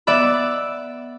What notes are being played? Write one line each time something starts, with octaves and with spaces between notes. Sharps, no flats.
B3 D5 E5 B5